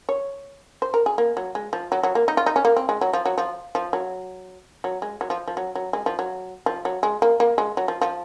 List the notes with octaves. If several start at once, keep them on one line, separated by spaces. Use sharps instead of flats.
C#5
C5
A#4
G#4
A#3
F#3
G#3
F3
F#3
F#3
A#3
D#4
F4
D#4
C#4
A#3
C4
G#3
F#3
F3
F#3
F3
F3
F#3
F#3
G#3
F#3
F3
F3
F#3
F#3
G#3
F3
F#3
F3
F#3
G#3
A#3
A#3
G#3
F#3
F3
F3